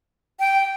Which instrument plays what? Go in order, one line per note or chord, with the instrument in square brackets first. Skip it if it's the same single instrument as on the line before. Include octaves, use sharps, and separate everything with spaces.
[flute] G5